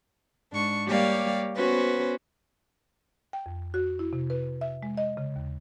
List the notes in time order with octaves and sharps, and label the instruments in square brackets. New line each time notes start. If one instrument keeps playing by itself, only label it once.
[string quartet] G#2 D4 C#6
G3 A#3 G4 C#5 D5 F5
B3 C#4 F#4 B4 C5
[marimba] G5
F2
F#4
E4
C3
B4
E5
G#3
D#5
C#3
D#2